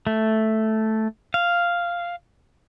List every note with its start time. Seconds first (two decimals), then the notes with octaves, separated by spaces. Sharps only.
0.07 A3
1.34 F5